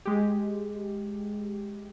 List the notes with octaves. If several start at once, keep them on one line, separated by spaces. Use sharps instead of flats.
G#3 G4